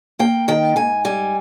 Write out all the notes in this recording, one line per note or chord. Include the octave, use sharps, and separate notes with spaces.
A#3 G5
D#3 G5
G#2 G#5
G3 G#5